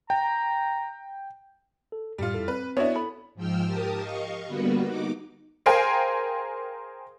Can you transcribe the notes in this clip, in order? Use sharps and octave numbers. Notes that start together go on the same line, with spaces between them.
G5 A#5
A4
F#2 A2 G3 F4 C#7
F2 E4 A4
C4 B4
B3 D4 E4 F#4 C#5
A4 B5
G#2 F3 G5 E6 F6
G4 A#4 A5 D#6
D#5 F5 C#6
D3 G3 A#3 B3 F#4 B4
D#4 D6
G#4 A#4 C5 F5 G5 G#5